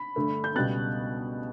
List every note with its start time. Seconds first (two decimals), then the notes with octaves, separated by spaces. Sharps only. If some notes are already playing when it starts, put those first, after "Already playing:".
Already playing: B5
0.16 G2 D3 A3
0.44 G6
0.55 C#2 B2 G3 B3 F#6 A6